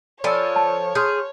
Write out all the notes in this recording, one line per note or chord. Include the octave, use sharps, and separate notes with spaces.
F3 A4 C#5 D5 G#5 B5 E6
A5
G#4 C6 F6 G6